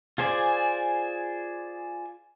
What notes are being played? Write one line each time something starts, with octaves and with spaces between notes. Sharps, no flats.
F4 G#4 C5 D5 G#5